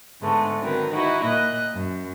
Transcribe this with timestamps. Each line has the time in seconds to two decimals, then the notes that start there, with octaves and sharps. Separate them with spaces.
0.20 G#2 D3 G#3 A3 B3
0.60 D3 D#3 F#3 C4 A#4 B4
0.91 D#4 E4 F#4 B4
1.22 A#2 A#3 D#5 F#6
1.75 F#2